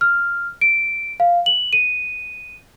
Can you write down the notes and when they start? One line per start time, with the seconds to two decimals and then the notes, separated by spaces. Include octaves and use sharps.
0.01 F6
0.61 D7
1.20 F5
1.46 F#7
1.73 D#7